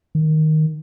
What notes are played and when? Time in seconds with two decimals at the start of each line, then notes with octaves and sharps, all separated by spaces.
0.15 D#3